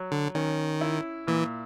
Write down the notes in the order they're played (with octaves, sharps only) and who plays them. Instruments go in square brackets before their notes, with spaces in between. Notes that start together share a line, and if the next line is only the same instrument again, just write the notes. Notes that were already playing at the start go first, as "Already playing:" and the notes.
Already playing: [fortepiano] F#3
[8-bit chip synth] D3
[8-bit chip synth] D#3 [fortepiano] C#4
[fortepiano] E4
[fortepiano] A#2 [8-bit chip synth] E3